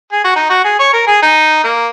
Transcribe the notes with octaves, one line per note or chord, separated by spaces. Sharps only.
G#4
F#4
D#4
F#4
G#4
C#5
A#4
G#4
D#4
A#3